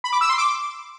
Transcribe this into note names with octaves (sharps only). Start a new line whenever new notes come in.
B5
D6
E6
C6
D6